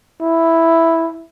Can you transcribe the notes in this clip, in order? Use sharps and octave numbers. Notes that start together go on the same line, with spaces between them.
E4